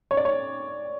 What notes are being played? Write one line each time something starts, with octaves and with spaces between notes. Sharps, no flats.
C#5
D5
C#5